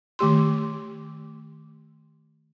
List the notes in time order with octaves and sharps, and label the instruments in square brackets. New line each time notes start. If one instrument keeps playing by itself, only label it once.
[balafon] D#3 A3 G4 C6